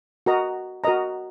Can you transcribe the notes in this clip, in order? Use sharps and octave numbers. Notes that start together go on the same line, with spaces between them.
F#4 A#4 D#5 A#5
F#4 A#4 D#5 A#5